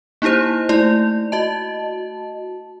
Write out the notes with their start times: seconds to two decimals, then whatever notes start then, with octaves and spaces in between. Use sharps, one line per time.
0.22 A#3 D#4 E4 G4 C5
0.69 A3 E4 D5
1.32 F#4 D#5 A5